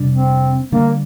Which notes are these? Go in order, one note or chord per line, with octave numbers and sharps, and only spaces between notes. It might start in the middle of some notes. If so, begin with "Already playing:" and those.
Already playing: F2 C3 G3 D4
C4
D3 G3 A#3 D4